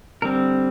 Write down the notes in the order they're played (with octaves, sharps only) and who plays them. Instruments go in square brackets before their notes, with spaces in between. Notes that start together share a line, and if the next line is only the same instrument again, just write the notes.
[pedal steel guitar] D3 G3 C4 A#4